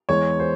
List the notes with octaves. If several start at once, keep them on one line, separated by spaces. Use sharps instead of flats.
E2 E3 G#3 C#5
C5